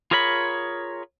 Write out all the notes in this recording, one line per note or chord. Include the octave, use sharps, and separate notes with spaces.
F4 G#4 A#4 C#5 B5